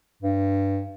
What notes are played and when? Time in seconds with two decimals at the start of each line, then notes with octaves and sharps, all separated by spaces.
0.23 G2